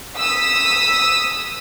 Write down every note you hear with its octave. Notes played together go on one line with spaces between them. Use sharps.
D#6 E6 B6